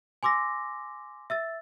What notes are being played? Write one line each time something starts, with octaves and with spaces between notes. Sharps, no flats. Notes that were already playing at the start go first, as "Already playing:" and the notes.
G#5 C6 D6 E6 A#6
E5 E6 A6